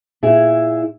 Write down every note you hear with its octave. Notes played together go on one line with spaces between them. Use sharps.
A#2 E4 G#4